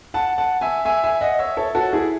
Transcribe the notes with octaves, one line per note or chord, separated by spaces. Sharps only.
F#5 A5
F#5 A5
E5 G#5
E5 G#5
E5 G#5
D#5 F#5
C#5 E5
A4 C#5
F#4 A4
E4 G#4